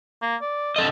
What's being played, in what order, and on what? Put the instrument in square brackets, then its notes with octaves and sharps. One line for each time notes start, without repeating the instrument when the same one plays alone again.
[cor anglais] A#3
D5
[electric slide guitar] D3 A4 D#5